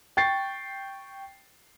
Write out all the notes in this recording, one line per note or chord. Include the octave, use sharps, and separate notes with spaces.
G5 C#6 A6 C7